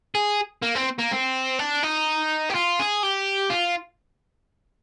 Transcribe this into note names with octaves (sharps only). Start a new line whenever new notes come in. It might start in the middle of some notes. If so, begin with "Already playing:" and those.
G#4
A#3
C4
A#3
C4
D4
D#4
G4
F4
G#4
G4
F4